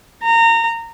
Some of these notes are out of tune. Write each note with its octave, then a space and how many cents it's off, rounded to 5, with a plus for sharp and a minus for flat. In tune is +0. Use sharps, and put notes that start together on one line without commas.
A#5 -25